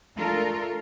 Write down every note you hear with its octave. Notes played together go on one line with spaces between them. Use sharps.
A3 D4 F4 A4 A#4